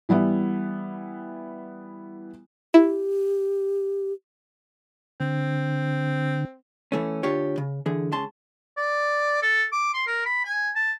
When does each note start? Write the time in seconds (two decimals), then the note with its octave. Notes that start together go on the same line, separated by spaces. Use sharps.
0.09 E3 G3 B3 E4
2.74 E4 G4
5.20 D3 C4
6.92 E3 A3 C#4
7.23 D2 D4 F4 G4 C#5
7.58 C#3
7.86 D3 E3 G#4
8.12 C#2 C#3 A5 C6
8.77 D5
9.42 A4
9.72 D6
9.94 C6
10.07 A#4
10.25 B5
10.44 G#5
10.76 A5